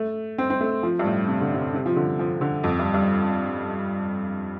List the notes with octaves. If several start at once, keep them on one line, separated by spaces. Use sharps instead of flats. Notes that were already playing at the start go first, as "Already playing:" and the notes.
Already playing: A3
C4
C4
A3
F3
G2
A2
C3
D3
C3
C3
F3
D3
F3
D3
F2
G2
G2